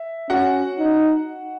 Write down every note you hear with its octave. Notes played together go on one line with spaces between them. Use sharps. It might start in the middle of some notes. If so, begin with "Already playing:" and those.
Already playing: E5
C#4 F#4 F#5
D#4